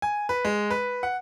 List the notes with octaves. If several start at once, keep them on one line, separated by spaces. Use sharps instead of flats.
G#5
B4
G#3
B4
F#5